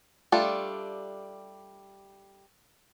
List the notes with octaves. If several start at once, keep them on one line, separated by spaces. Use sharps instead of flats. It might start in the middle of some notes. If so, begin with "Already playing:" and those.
G3 A3 D4 F4 A4